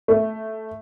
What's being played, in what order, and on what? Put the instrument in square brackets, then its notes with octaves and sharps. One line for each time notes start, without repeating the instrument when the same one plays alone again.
[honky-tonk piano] A3